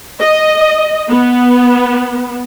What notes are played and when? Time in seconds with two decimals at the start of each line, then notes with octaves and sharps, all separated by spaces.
0.21 D#5
1.10 B3